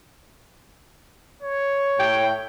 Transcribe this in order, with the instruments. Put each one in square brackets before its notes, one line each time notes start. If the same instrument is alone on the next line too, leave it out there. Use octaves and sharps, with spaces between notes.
[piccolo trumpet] C#5
[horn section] A2 G5